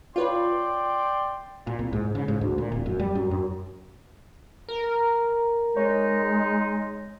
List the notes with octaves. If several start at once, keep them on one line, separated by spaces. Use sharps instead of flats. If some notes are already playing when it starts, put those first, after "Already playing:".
F4 B4 C#5 D5 G5 C6
A#2
C2
G#2
C#3
G#2
D2
A#2
D1
F#2
G3
F#2
F#2
A#4
G#3 D#4 C#5